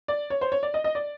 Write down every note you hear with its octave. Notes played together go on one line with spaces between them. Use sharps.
D5
C#5
C5
C#5
D5
D#5
D#5
D5